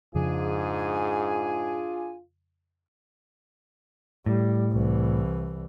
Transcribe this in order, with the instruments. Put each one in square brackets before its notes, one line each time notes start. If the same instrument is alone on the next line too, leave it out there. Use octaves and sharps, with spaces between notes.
[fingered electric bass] F2 C#3 F3 [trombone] G#2 [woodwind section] D4 G#4 G#5 [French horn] F4
[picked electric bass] A2 [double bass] G3
[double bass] C2 E3